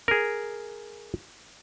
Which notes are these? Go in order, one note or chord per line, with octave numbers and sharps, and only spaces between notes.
G#4 A#4